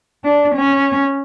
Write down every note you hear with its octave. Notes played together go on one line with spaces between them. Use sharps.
D4
C#4